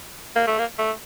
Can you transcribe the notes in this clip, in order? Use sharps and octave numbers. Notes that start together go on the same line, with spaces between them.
A#3
A3
A#3
A3